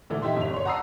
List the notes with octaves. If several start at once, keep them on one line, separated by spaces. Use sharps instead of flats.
A#2 D3 E3 A3
D#4 G4 E5 C6
G1 F7
C#5 C6
F#5 A5 A#5 D#6 E6 C7